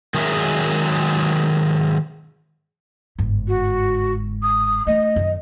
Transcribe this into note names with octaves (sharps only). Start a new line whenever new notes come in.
D#3 F#3 G#3 G#4 A#4 E5
G1 G#2
F#4
D#6
A3 D4 D#5
F#2 D#3